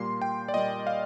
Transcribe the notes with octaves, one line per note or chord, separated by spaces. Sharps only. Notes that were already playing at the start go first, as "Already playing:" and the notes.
Already playing: A#2 G3 A#3 C6
G5
D5
A#2 G3 A#3 D#5
F5